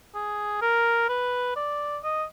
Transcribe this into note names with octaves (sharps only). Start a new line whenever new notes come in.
G#4
A#4
B4
D5
D#5